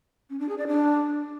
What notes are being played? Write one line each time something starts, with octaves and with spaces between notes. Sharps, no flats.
C#4
D4
G#4
D5
D4